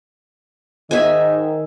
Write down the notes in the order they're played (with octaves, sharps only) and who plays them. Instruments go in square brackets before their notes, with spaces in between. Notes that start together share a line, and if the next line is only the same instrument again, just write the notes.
[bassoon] G#2 [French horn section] D#3 [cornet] D#5 [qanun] E5 G#5